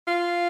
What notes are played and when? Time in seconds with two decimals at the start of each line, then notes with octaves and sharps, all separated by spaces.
0.07 F4